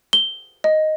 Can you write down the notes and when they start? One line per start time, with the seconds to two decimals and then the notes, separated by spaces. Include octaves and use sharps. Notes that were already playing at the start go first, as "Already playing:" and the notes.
0.13 G7
0.64 D#5